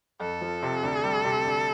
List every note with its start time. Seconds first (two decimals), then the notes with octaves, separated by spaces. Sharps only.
0.20 F2 A4
0.41 F3
0.63 C3
0.83 D2
1.03 G3
1.25 C3
1.45 D2